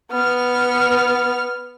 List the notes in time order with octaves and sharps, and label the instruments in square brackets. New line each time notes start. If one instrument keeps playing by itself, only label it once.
[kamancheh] B3 F6